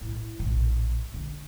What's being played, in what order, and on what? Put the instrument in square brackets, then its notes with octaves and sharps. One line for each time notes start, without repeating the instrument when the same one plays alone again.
[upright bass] A2 E4
A#1 A2
D3